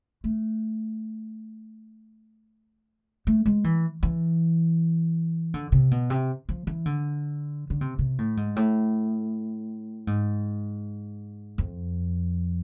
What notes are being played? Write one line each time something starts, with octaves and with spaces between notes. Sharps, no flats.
A3
A3
G#3
E3
E3
D3
C3
B2
C3
F3
E3
D3
D3
C3
C3
A2
G#2
A2
G#2
F2